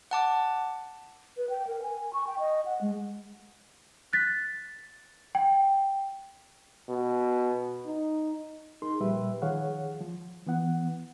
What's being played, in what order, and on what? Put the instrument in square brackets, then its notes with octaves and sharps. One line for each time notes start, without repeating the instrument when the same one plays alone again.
[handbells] F#5 A5 D6
[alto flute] B4
G5
A#4
G#5
C#6
G5
D#5
F#5
G#3
[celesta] F#6 A6 B6
G5
[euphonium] B2
D#4
[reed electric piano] D#4 G#4 A#4 C6
A#2 F3 G3 G4 B4 E5
D#3 F3 G#4 C#5 F5 F#5
F3
E3 B3 F#5